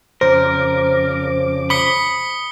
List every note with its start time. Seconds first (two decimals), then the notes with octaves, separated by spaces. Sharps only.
0.21 F2 C#3 A#4 C5 D6
1.70 B5 D#6 B6 C#7 G7